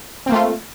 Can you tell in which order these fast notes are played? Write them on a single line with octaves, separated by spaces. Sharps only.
C4 A#3 A3 F4